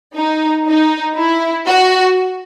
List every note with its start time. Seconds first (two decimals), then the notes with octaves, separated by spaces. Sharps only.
0.15 D#4
0.66 D#4
1.17 E4
1.67 F#4